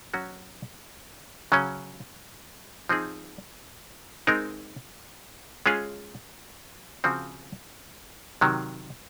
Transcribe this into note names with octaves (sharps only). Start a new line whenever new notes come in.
F#3 C#4 F#4
C#3 F#3 C#4
F3 C4 D#4 G#4
G#3 C4 D#4 A#4
G#3 C#4 F4 G#4
C#3 F3 C4 F#4
C3 D#3 F#3